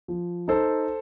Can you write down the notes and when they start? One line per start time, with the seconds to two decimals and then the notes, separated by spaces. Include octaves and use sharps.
0.08 F3
0.48 D#4 A4 C5